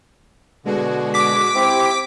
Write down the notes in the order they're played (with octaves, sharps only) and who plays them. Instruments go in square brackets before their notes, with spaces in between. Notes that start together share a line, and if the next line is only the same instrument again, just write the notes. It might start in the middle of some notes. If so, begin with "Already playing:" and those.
[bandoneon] B2 D3 [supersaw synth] G#3 F#4
[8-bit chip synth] D6 B6
[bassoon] C4 [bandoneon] E4 [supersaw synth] G4